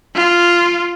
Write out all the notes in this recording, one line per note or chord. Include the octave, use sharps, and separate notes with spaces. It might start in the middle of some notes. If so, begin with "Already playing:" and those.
F4